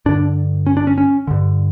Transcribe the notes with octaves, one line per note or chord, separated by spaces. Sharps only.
G2 D3 D4
C#4
D4
C#4
C#4
G2 D3